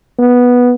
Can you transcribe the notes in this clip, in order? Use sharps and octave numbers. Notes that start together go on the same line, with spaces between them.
B3